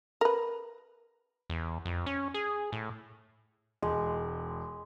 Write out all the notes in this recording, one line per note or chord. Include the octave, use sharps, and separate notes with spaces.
A#4 B4
E2
F2
C#4
G#4
A2
E1 G#3